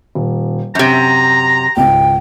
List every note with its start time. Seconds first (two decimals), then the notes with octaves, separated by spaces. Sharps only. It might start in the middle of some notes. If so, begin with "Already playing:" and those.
0.15 D#1
0.75 F#2 C3 A#5 G6
1.77 G#1 C#2 G5